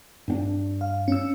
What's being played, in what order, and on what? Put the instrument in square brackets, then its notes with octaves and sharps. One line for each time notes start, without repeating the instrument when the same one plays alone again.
[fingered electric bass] G2 C4 D4
[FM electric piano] F5
C#4 E6